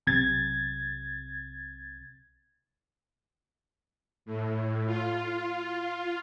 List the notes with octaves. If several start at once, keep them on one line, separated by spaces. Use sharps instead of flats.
B1 C3 G#6 A6
A2
F4